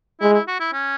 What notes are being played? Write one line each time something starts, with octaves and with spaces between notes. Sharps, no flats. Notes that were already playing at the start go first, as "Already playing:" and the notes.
G#3 E4
E4
F#4
E4
C#4